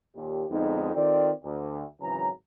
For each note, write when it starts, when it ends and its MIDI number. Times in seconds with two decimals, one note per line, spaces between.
0.16 0.45 39
0.16 0.45 46
0.16 0.45 67
0.50 0.94 41
0.50 0.94 50
0.50 0.94 56
0.50 0.94 59
0.50 0.94 63
0.95 1.32 51
0.95 1.32 60
0.95 1.32 65
0.95 1.32 69
0.95 1.32 74
1.44 1.83 38
2.01 2.29 32
2.01 2.29 49
2.01 2.29 52
2.01 2.29 54
2.01 2.29 82